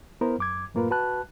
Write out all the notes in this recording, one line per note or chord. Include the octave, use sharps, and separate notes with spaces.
B3 E4 A#4 C5
F#2 D6 G#6
F#2 A2 A#3 F4 A#4 B4
F#4 B4 A5 F#6